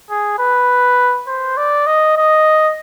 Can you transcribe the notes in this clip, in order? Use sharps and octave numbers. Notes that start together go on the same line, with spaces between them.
G#4
B4
C5
D5
D#5
D#5